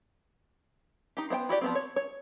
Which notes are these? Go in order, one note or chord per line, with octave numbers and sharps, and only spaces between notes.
D#4 G4
B3 C5 F5 G5
E4 F#4 G4 D5
F3 B3 C4
C#5
C#5